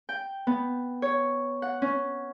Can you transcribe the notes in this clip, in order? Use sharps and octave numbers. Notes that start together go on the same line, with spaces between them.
G5
B3
C#5
F#5
C#4